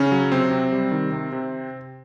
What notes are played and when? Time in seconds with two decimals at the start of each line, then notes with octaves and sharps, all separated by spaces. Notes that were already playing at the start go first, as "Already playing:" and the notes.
Already playing: C#3 C#4
0.12 F#3
0.32 C3 C4
0.51 C3
0.72 G3
0.91 D#3
1.12 C3
1.32 C3